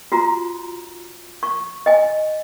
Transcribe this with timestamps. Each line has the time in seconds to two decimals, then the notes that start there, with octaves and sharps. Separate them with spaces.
0.12 F4 F#4 A#5
1.43 C#6
1.86 D#5 G#5